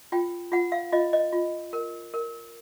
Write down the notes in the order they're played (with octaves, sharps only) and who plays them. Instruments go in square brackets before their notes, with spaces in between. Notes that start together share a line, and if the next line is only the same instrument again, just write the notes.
[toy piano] F4 G5
F4 F#5
F5
F4 D#5
D#5
F4
A#4
A#4